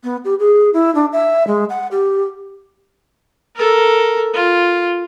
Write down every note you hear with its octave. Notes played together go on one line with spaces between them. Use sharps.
B3
G4
G#4
E4
D4
E5
G#3
F#5
G4
A4 A#4
F4